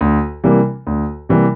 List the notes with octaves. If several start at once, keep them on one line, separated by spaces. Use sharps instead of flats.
D2
C3 E3 G3 A#3
D2
C3 E3 G3 A#3